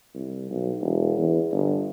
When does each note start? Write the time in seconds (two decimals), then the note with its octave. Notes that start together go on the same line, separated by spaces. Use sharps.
0.14 C2
0.50 B1
0.80 E1
1.18 E2
1.52 G1